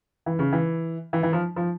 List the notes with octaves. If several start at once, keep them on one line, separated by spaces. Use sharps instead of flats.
E3
C#3
E3
E3
E3
F3
F3